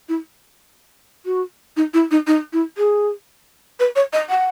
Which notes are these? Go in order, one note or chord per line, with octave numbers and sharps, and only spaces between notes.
E4
F#4
D#4
E4
D#4
D#4
E4
G#4
B4
C#5
D#5
F#5